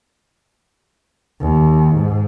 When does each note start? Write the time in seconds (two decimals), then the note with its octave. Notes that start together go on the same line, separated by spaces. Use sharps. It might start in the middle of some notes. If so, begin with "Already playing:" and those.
1.41 D#2
1.96 G#2